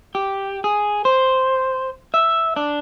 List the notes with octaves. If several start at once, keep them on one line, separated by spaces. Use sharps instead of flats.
G4
G#4
C5
E5
D4